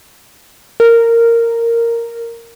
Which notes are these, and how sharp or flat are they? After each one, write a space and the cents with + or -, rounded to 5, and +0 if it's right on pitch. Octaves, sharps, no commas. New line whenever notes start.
A#4 -10